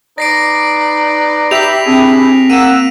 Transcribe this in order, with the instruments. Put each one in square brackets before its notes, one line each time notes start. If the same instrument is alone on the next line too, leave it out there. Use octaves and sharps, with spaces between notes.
[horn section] D#4 B4 D5 [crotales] A#6 C7 D7
[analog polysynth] G4 E5 B5 [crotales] B6 F7
[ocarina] C4 [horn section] D4 E4 G#4
[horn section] A#3 F#5 [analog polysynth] E6 [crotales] D#7 E7